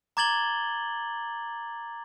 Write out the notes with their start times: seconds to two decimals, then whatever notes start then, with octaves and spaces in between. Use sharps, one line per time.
0.17 A#5 D6 G#6 A6 F#7 G7